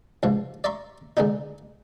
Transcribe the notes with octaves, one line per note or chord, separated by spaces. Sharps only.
C#2 G#2 F3
D5 E5 A#5 C6 C#6
D3 G#3 B3 D4 D#4